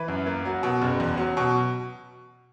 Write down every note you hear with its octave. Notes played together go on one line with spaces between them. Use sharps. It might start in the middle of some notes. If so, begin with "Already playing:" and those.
Already playing: E3 B4
F#2
A#3
F#3
B2
F#1
E2
F#3
B2